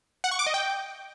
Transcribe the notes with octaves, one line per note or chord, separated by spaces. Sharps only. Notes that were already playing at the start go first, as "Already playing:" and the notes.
F#5
C#6
D6
D#5
G5